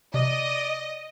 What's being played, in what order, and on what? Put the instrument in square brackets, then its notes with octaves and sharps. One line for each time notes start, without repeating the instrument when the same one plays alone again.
[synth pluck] C3 [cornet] D5 [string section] D#5